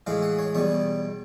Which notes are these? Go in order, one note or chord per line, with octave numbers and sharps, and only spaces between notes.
A2 E3 G#3 F5
F#5
C#5
E2 B2 G3 C#5